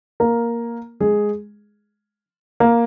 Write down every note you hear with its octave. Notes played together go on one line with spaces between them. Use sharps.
A#3 A#4
G#3 G#4
A#3